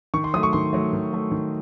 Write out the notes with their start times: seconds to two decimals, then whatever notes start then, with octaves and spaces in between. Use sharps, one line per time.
0.14 D#3 C#6
0.24 C6
0.34 F#3 A3 D#6
0.43 C#6
0.53 D#3 C6
0.73 F#3 A3
0.93 D#3
1.13 F#3 A3
1.32 D#3